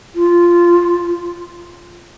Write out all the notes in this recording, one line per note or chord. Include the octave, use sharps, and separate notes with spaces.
F4